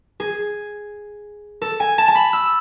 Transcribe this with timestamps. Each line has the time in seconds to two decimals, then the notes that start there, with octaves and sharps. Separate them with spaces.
0.20 G#4
1.62 A4
1.80 G#5
1.98 A5
2.08 A5
2.15 B5
2.33 E6